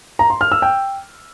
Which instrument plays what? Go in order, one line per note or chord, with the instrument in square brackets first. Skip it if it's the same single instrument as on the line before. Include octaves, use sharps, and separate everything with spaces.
[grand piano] A#5
C6
F6
E6
G5